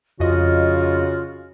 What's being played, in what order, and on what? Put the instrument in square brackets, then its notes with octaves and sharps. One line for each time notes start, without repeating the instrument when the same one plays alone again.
[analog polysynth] F2 D#5 [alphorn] C#3 [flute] F4 [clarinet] F#4